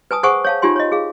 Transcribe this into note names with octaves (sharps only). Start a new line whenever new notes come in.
B4 G#5 A5 D#6
G#4 C5 F#5 G#5 C#6 D#6
C#5 F5 A5
D#4 F4 G4 G#5 C6
C#5 D#5
G#4 F5